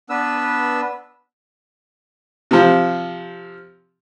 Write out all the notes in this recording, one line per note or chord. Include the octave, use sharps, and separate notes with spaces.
B3 D4 B4 E6
C3 F3